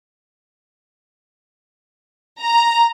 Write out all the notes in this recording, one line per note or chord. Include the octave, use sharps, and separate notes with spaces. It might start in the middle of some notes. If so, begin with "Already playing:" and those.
A#5